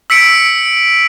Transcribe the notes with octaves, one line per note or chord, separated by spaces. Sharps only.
E6 B6 C#7 D7